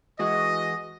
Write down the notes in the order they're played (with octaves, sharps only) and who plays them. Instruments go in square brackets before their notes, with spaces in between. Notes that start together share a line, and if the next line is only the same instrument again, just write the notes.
[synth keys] E3 G#3 F#4 [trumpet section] D#5